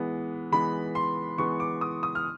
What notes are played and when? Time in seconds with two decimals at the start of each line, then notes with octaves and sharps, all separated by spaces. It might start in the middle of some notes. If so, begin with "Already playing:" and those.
Already playing: E3 G#3 B3
0.52 E3 G#3 B3 B5
0.95 C6
1.38 E3 G#3 B3 C#6
1.60 D6
1.81 D#6
2.03 D#6
2.15 F6